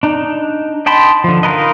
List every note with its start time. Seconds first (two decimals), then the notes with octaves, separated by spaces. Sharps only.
0.03 D4 D#4
0.86 D#5 G5 A5 B5 C6
1.24 D3 F3
1.43 D#4 F4 A#4 B4 D#5